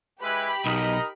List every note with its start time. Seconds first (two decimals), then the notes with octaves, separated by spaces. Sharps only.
0.22 G#3 E4 G4 B4 B5
0.66 B1 D#4 A#4 D#5